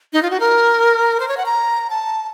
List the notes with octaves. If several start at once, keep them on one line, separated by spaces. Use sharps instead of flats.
D#4
F4
F#4
A#4
C5
C#5
F#5
A#5
A5